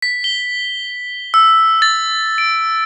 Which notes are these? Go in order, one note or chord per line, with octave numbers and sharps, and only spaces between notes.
B6
G7
E6
A6
D7